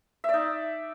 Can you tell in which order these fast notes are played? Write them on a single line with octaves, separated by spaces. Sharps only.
E5 D5 D#4